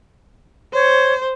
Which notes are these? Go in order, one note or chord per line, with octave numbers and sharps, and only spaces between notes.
C5 C#5